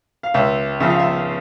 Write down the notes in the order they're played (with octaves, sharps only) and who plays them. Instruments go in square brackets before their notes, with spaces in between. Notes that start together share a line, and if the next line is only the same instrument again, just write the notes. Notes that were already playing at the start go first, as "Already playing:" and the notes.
[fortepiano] F5
C#2 E5
C#3 F3 E5
F5
E5